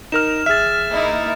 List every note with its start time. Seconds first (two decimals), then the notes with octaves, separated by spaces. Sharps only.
0.12 D#4 A#4 F6 E7
0.46 A1 G#4 E5 F6 A6
0.90 A#3 D#4 E4